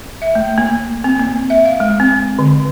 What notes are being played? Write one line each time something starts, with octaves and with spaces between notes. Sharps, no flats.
E5
A3
A#3
C4
A#3
E5
F5
G#3
C4
D3